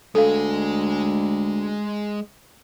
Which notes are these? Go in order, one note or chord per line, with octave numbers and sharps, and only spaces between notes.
D2 G#3 A4 F5 G#5